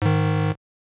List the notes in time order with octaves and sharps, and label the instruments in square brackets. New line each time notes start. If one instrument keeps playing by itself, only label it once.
[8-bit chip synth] G#2 D#3